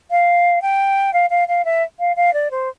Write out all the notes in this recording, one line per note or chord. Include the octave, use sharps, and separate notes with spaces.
F5
G5
F5
F5
F5
E5
F5
F5
D5
C5